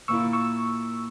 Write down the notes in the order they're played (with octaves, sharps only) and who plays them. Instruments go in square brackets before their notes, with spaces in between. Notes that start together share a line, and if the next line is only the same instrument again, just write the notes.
[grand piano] A#2 A#3 E4 [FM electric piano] C#6 E6
[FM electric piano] C#6 E6